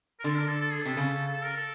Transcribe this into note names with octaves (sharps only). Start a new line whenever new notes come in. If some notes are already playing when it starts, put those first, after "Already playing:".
A#4
D3 A4
A#4
A4
A4
G#4
C3 A4
C#3
A4
A#4
A4